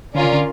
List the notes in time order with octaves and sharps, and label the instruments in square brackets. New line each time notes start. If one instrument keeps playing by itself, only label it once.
[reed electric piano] D3 [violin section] C#4 F4 A#4 D5
[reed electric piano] C#3
D3